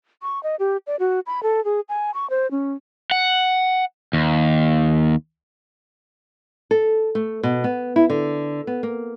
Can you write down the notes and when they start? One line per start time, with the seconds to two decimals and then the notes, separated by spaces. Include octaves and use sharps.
0.22 C#6
0.43 D#5
0.60 G4
0.87 D5
1.00 F#4
1.26 B5
1.43 A4
1.65 G#4
1.89 G#5
2.14 C#6
2.30 C5
2.51 C#4
3.11 F#5
4.13 D#2
6.71 A4
7.15 A3
7.43 B2
7.64 B3
7.96 E4
8.10 D3
8.67 B3
8.83 A#3